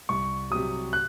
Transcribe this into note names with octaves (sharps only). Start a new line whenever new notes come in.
C2 C#6
C3 F#3 D#6
F#6